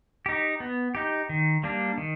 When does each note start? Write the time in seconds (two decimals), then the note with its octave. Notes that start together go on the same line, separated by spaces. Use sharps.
0.26 D#4 G4
0.60 B3
0.95 D#4 G4
1.29 D#3
1.63 G3 A#3 D4
1.98 D#3